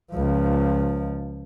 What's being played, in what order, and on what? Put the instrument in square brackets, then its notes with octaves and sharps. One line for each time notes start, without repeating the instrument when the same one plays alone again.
[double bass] C#2 F3